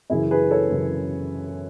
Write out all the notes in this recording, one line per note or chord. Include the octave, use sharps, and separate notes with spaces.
F#2 C#3 E3 E4 G#4
G#4 B4
A4 C#5
F#2 C#3 E3